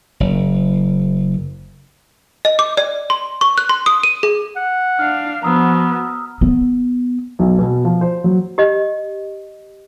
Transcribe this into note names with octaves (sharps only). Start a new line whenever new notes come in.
F#1
D#5
D6
D5
C6
C#6
F#6
C6
D#6
D#7
G#4
F#5
D4 F5 F6
F3 B3 F#4 A#5 D#6 E6
B3
B1
B2
F3
C5
F#3
G4 D#5